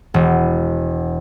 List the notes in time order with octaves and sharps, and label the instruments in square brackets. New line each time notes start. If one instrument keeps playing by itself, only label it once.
[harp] E1